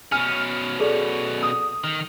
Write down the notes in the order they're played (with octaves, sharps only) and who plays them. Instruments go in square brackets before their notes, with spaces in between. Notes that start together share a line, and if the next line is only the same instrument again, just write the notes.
[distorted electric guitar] B2 C#4 [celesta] G#5 [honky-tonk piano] F6
[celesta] G#4 A4 D5
[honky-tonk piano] D#6
[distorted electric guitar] D#3